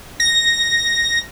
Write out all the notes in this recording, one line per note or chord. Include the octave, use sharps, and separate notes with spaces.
A#6